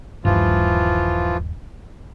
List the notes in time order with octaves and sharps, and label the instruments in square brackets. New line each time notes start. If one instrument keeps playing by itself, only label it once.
[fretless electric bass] D#1 G2 [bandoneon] E3 F3 F4